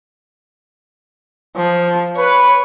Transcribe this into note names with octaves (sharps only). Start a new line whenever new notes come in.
F3
B4 C#5